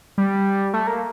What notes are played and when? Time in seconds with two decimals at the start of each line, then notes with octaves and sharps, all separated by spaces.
0.18 G3
0.74 A3
0.87 A#3